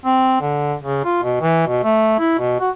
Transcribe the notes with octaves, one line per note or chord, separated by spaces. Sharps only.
C4
D3
C#3
F4
B2
E3
B2
A3
E4
B2
F#4